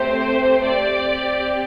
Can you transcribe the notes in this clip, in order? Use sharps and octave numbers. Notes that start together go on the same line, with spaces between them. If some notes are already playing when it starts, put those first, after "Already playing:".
Already playing: A3 C4 G4 C5
C4 G4 D5